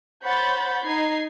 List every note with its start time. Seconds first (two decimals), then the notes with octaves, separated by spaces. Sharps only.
0.24 C5 C#5 F#5 B5 G6 A6
0.84 D#4 G#6 C7